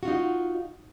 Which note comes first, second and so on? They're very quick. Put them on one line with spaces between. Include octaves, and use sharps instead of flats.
F#4 F4 D#4